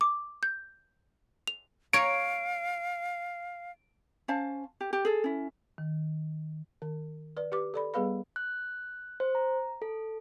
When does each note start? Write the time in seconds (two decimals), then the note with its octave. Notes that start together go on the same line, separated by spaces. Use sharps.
0.01 D6
0.43 G6
1.47 F7
1.93 C#5 F5 A#5 D7
4.28 C#4 C5 F5 A5
4.81 G4
4.93 G4
5.05 G#4 A4
5.24 C#4 E4
5.78 D#3
6.82 D#3
7.37 B4 D5
7.52 G4 B4 D6
7.74 A4 D5 B5
7.94 G3 B3 G#4 B4 F5 B5
8.36 F#6
9.20 C5
9.35 A#5
9.82 A4